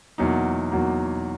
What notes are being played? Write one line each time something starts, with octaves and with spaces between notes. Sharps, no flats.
E2 B2 F#3 A#3 D#4
E2 B2 F#3 A#3 D#4